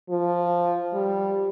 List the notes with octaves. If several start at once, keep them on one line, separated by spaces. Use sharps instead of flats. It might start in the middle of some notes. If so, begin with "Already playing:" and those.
F3
G3